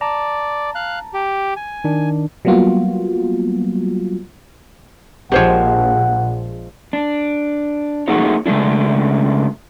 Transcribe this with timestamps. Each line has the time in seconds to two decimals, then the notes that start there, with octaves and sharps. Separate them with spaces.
0.01 D5 A5 A#5
0.75 F5 F#6
1.14 G4
1.56 G#5
1.84 D#3 D4
2.45 F#3 G3 A#3 B3 F4 F#4
5.32 A#1 F3 G#3 G4 C5 C#5 F#5
6.93 D4
8.08 A3 A#3 D#4 F#4 G#4 C#5
8.46 C#3 G#3 A3 D4 E4